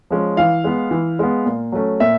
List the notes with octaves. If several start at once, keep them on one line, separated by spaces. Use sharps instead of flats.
F3 G#3 C#4
E3 F5
G#3 B3
E3
G#3 B3
A#2
F#3 A3 C#4
A#2 E5